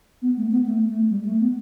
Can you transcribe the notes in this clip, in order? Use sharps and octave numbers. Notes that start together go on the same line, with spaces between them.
B3
A3
B3
A3
A3
G3
A3
B3